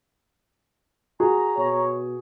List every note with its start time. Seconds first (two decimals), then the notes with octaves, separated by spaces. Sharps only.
1.20 F#4 G#4 A#5
1.58 B2 C#5